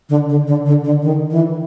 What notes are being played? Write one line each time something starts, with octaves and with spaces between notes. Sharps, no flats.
D3
D3
D3
D3
D3
D#3
E3